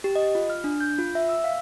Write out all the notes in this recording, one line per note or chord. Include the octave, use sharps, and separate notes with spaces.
G4
D#5
F4
F6
D4
G6
F4
E5
E6
F5